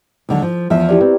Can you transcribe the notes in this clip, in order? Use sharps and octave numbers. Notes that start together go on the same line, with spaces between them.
D#2 D3 F#3
F3
E2 F3 E5
E4 G4 D5
C4 B4